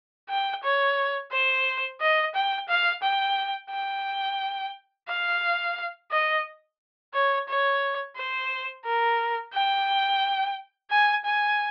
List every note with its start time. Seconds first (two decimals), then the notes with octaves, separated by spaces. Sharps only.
0.30 G5
0.63 C#5
1.32 C5
2.00 D#5
2.35 G5
2.69 F5
3.03 G5
3.71 G5
5.09 F5
6.11 D#5
7.14 C#5
7.48 C#5
8.16 C5
8.85 A#4
9.54 G5
10.90 G#5
11.25 G#5